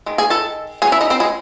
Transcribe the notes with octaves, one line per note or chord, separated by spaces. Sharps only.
D#3 G#3
G#4 G#5
A4 A5
F#3 C#4 G#4 G#5
E4 E5
D#4 D#5
C4 C5
G#3 G#4